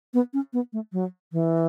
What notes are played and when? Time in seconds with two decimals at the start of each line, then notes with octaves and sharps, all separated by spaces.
0.14 B3
0.33 C#4
0.53 B3
0.73 A3
0.93 F#3
1.32 E3